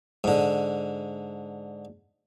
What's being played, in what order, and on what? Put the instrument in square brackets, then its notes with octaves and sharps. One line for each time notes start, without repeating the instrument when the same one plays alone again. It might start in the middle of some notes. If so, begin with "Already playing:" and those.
[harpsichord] G#2 D3